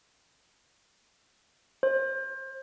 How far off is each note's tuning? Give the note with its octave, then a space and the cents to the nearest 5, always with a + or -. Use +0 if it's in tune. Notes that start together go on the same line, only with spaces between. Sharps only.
C5 +30